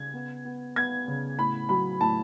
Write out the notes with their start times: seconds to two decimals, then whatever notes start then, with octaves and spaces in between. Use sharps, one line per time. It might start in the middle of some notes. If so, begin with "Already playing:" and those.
Already playing: C#3 G#6
0.14 B3
0.45 B3
0.76 B3 G#6
1.08 C#3
1.39 A2 B5
1.69 F#3 B5
2.01 A2 A5